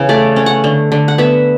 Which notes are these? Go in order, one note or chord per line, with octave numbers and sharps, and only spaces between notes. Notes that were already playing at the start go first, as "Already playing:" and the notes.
Already playing: C#3 E3 B3
A3 D5
C#4
F#5
D3
D3
F#5
B3 E5